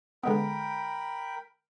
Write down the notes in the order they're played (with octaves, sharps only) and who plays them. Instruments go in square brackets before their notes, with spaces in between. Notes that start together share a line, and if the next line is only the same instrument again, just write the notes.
[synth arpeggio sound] D3 G#3 B3 [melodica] A#4 G5 B5